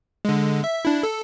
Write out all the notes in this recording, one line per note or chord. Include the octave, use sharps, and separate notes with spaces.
D3 G#3
E5
D4 E4
A4